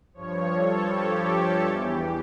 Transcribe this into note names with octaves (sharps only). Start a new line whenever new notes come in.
G2 F3 C#5
A4
G4
A4
E2 E3 G4